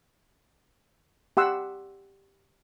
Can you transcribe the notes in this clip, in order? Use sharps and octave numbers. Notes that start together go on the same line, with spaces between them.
G4 F#5 C6 E6